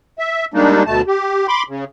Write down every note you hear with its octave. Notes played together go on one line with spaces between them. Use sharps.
E5
G3 G#3 A#3 D4 D#4
D2 B2 A3 A5
G4
B5 C6 D6
C#3